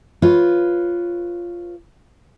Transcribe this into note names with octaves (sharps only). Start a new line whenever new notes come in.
F4 B4 C#5